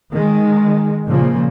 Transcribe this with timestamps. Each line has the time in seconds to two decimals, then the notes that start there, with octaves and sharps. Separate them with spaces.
0.12 D#3 G#3
1.09 A#2 C#3 F3 A#3